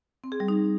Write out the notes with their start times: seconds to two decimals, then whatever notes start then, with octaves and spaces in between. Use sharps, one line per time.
0.24 C4
0.32 G#4
0.40 G3
0.48 D#4